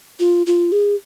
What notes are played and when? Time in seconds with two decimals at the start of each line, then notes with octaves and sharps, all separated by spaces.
0.20 F4
0.47 F4
0.72 G#4